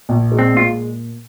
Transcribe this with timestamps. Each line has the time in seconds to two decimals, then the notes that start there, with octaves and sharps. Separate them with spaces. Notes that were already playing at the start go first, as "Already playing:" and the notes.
0.09 A#1
0.32 G#3
0.39 C4
0.54 A#2 F4